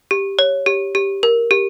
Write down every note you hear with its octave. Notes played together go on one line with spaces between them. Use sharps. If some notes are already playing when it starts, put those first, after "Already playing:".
G4
C#5
G4
G4
A#4
G4